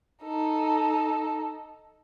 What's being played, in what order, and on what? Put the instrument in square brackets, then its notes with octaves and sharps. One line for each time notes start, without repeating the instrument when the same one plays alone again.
[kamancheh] D#4 A4